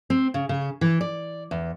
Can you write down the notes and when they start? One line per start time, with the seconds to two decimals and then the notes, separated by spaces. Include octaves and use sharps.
0.10 C4
0.34 C#3
0.49 C#3
0.81 E3
1.01 D5
1.51 E2